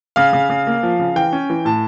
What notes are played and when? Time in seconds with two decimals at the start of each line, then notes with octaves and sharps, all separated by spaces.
0.16 C#3 F5
0.33 C#3
0.50 C#3
0.67 A#3
0.83 F3
0.99 C#3
1.16 E3 G5
1.33 C#4
1.50 E3
1.65 A2 A5